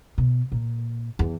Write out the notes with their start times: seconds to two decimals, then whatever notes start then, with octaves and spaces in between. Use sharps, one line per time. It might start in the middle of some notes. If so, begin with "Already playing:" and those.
0.18 B2
0.52 A#2
1.19 E2